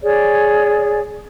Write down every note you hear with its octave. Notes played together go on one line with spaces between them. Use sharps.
G#4 C#5 D5